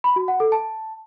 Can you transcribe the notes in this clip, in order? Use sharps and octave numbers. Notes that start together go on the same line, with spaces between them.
B5
F#4
F#5
A4
A5